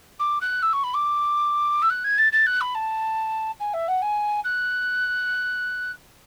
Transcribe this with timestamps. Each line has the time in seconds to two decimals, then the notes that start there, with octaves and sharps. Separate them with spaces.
0.19 D6
0.41 F#6
0.62 E6
0.72 C#6
0.83 B5
0.94 D6
1.82 E6
1.89 F#6
2.04 G#6
2.18 A6
2.32 A6
2.46 F#6
2.60 B5
2.74 A5
3.59 G#5
3.73 E5
3.88 F#5
4.01 G#5
4.44 F#6